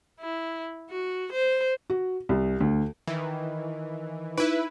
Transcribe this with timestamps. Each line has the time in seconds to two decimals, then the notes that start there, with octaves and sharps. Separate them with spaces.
0.20 E4
0.90 F#4
1.32 C5
1.90 F#4
2.29 C2
2.60 D2
3.07 D#3 E3
4.38 D#4 E4 B4